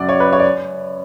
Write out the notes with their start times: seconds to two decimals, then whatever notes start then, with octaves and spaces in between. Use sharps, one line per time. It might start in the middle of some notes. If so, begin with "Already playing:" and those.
Already playing: F#2 C#3 F#3 D5 F#5
0.09 C#5
0.20 B4
0.33 C#5
0.39 D5